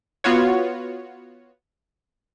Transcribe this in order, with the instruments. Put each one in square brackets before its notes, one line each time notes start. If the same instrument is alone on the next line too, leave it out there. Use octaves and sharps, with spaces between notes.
[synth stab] B3 F4 F#4 C#5